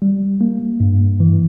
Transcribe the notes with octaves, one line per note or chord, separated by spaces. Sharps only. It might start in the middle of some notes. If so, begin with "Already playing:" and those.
G3
A#3
G2
E3